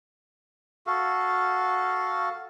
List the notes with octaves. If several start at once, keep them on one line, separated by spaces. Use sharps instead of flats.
F#4 A4 F5